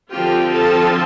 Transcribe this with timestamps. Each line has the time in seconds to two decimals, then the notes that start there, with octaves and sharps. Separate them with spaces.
0.11 D3 F3 C4 F4 G4 G5
0.53 A4 A5